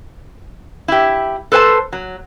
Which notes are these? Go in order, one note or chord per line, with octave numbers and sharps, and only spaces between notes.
E4 G4
A4 B4 C5 G5 A5
F#3